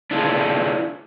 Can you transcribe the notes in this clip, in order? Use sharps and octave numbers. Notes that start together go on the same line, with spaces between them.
D4 E4 F4 G#4